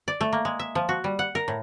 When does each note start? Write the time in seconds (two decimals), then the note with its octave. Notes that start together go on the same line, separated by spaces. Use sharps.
0.08 D5
0.21 A3
0.33 A#3
0.45 G#3
0.59 E5
0.75 F3
0.89 F#4
1.04 G3
1.19 F#5
1.35 A#4
1.48 A2